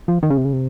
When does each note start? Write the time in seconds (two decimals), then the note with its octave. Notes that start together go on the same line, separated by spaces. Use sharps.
0.08 F3
0.23 D#3
0.30 C#3
0.37 C3
0.45 C#3
0.53 C3